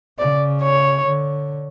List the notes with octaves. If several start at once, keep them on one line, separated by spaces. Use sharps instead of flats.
C#3 D5
C#5
D3